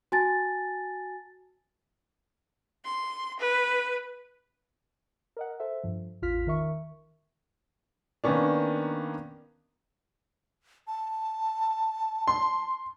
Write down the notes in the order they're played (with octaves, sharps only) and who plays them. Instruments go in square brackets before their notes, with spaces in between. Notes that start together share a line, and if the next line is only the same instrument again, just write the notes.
[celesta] F#4 G#5 A5 A6
[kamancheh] C6
B4
[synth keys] A#4 D#5 F#5
A4 C5 E5
G2 F3
A1 E2 F4 F6 B6
D#3 A#4 E5 C#6
[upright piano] D#3 A#3 B3 C#4 D4
[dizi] A5
[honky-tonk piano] C6